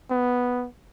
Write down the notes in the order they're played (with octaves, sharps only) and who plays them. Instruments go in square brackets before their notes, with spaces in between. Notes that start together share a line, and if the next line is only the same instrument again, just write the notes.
[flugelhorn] B3